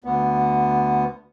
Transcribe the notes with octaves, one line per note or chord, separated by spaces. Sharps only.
D2 B3